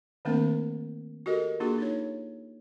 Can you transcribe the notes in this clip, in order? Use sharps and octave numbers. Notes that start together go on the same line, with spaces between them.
D#3 A3 A#3 C4 D4 A#4
F#4 G4 A4 A#4 D#5
A#3 D4 F4 F#4 G#4
D4 D#4 C#5